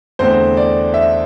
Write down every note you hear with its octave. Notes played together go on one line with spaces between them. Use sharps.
E2 D3 A3 C4 C5
D5
E5